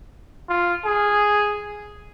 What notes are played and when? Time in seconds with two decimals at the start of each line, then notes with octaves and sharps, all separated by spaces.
0.49 F4
0.85 G#4